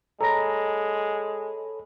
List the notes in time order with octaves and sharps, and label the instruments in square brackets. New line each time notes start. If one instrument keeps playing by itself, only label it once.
[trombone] G#3 [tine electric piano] A4 C#5 B5 [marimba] A#5 A#6